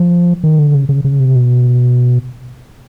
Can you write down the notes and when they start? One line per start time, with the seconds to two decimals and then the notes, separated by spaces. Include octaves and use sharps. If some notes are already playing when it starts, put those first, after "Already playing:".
Already playing: F3
0.44 D#3
0.59 D3
0.74 C#3
0.89 C#3
1.05 C#3
1.20 C3
1.36 B2